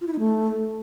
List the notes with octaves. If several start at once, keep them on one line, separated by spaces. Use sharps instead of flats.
F4
E4
D#4
A3